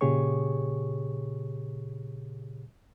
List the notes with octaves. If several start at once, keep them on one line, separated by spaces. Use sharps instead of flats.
A#2 C#3 G4 G#4 C#5 C#6